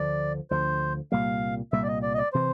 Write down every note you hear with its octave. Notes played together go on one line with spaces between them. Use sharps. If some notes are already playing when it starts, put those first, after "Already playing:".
Already playing: D2 D3 F3 D5
D2 D3 F3 C5
C2 A#2 G3 A#3 F5
C2 A#2 G3 A#3 E5
D5
D#5
D5
D#5
D5
C3 E3 C5